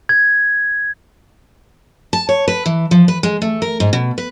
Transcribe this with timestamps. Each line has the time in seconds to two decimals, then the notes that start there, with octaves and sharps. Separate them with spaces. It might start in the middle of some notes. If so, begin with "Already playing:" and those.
0.09 G#6
2.13 A5
2.29 C#5
2.48 B4
2.66 E3
2.91 F3
3.08 B4
3.23 G#3
3.42 A3
3.62 A#4
3.80 G#2
3.93 B2
4.18 B4